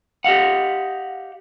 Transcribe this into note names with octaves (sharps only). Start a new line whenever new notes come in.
G4 D#5 F5 F#5